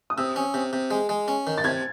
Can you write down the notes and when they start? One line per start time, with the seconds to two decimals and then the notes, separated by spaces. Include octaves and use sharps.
0.10 D#6
0.17 C3 E6
0.36 C#4
0.54 C3
0.73 C3
0.91 G#3
1.09 G#3
1.28 C#4
1.47 D#3
1.58 A6
1.64 C3 G#6